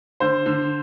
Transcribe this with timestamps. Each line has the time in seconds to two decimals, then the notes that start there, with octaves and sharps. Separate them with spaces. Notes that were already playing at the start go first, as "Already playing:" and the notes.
0.20 D3 C5
0.46 D3